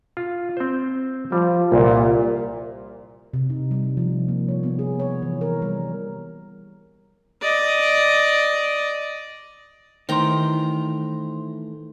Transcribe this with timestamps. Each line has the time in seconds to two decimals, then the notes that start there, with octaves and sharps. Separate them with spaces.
0.17 F4
0.57 C4 C5
1.32 F3 G3
1.72 C2 A#2
3.33 C3
3.50 D#4
3.71 G3
3.97 F3
4.28 A#3
4.48 C#5
4.63 B3
4.79 G#4
5.00 C#5
5.22 E3
5.41 A#4
5.62 G3
7.41 D5 D#5
10.09 A2 D#3 E3 C5 G5 A#5 C6